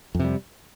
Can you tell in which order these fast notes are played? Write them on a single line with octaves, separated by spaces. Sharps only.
F2 C3 G3